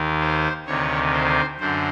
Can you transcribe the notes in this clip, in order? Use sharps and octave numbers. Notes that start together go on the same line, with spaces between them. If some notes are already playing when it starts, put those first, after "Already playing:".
Already playing: D#2 D#3
C5
D2 C3 D#3 C#5
C5
F#2 D3 C5